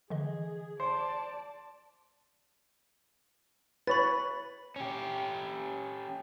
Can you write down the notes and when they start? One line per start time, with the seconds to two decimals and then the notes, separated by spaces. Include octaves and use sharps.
0.10 D3 E3 G#4 D#5
0.80 C5 D5 A5
3.87 B4 C#5 B5 A6
4.76 C#4 G4